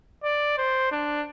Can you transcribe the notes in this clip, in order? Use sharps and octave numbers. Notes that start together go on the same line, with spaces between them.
D5
C5
D4